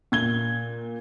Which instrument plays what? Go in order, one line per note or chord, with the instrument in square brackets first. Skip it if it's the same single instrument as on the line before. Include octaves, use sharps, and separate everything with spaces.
[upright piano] A#2 G#6 G7